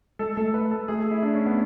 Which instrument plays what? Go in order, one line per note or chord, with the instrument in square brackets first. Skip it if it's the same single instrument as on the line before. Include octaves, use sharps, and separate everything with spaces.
[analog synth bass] G#3 [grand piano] A4
[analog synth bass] A3 [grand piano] A4
[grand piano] B4
A4
[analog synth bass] A3 [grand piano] G#4
[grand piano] G#4
E4
D4
C#4
B3